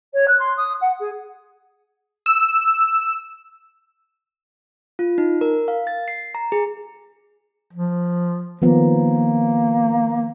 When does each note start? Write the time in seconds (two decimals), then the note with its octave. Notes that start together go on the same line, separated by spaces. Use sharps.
0.13 C#5
0.27 F#6
0.39 C6
0.56 D#6
0.81 F#5
0.99 G#4
2.26 E6
4.99 F4
5.18 D#4
5.41 A#4
5.68 F5
5.87 A6
6.08 C7
6.35 A#5
6.52 G#4
7.73 F3
8.62 D#3 F3 A#3 B3